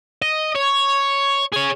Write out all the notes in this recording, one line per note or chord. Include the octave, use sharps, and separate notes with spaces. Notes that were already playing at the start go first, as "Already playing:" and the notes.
D#5
C#5
G#4 C#5